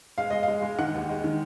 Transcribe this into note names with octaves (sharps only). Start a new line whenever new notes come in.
G#3 F5
G#3 D#5
F5
G#3
G#3
D#3 F#5
D#2
G#3
D#3